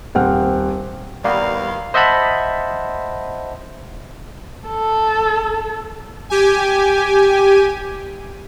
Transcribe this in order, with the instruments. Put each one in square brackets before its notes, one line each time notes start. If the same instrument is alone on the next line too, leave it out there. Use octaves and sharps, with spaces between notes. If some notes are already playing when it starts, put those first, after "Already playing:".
[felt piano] D#1 C4 F#5 G5 F6
[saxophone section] D#2 E3 F5 [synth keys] G3 A#3 B3
[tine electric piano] C5 D#5 E5 F#5 A5 B5
[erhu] A4
[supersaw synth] G4 G#5